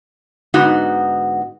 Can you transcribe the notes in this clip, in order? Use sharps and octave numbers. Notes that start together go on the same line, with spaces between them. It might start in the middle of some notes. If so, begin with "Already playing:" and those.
G#2 D3 B3 D#4 F#4